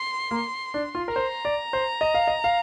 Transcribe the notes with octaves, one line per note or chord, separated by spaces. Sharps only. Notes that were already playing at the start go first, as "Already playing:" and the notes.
Already playing: C6
A#3
D4
F4
A#4
C5 A#5
D5
C5
D#5
F5
D#5
F5